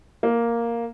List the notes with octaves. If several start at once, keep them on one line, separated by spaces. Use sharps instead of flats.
A#3